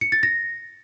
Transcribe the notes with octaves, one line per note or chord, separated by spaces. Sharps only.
C#7
A6
A#6